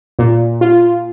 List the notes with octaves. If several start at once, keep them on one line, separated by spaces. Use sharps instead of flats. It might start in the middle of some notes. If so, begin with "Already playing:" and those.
A#2
F4